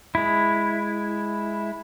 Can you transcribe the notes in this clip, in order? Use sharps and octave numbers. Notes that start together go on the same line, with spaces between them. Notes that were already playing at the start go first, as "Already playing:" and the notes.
G#3 E4